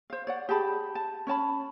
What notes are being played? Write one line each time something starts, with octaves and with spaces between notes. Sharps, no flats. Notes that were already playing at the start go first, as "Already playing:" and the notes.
C5 F5
C#5 D5 F#5
G4 G#4 A5 B5
A5
C#4 C#5 A5 B5